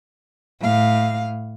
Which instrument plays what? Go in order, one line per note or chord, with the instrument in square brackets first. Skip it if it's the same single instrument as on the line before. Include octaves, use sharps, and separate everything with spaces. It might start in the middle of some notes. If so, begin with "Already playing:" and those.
[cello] A2 F5